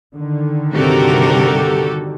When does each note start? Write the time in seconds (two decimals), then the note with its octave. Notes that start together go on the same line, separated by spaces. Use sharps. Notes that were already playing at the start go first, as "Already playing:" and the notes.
0.15 D3 D#3
0.73 G2 C3 F#4 G4 A4 A#4